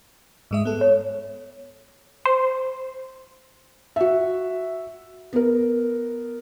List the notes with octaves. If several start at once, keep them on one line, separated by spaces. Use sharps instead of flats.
G#2 G#3 E5
B3 A4
C#5
C5
F#4 E5
B3 A#4